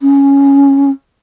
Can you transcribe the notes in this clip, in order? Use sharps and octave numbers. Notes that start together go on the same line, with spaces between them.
C#4